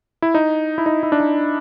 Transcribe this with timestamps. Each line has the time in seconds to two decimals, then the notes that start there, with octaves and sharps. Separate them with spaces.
0.22 E4
0.35 D#4
0.78 E4
0.86 D#4
1.03 E4
1.12 D4
1.20 D#4